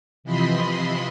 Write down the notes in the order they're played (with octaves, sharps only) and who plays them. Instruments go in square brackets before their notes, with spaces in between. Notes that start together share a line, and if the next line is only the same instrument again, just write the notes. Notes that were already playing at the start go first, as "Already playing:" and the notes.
[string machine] C3 E3 F3 D#5 B5 C6